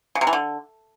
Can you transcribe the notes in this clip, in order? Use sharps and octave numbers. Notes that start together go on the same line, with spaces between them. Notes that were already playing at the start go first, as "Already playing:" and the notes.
C#3
C3
E3
D3